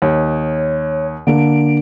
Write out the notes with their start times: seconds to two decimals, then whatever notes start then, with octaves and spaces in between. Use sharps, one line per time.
0.02 D#2 C#5
1.27 D3 A#3 D4 D7